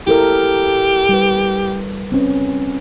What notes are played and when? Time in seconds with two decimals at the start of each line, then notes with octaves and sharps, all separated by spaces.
0.07 E4 G4 A4 A#4
1.09 G3 B4
2.12 C4 C#4 B4